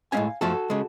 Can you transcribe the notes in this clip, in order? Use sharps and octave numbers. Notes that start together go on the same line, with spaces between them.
A2 G#3 C#4 F5 G#5
F#2 F3 A3 F#4 A4
C#3 G#3